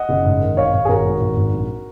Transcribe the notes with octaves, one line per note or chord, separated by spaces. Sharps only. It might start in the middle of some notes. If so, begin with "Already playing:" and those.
Already playing: D#5 F#5
F#1
G#2
D#3
G#1 C#5 F5
G#1
G#4
G#1 F#4 A#4
G#2
G#1
G#2
A#1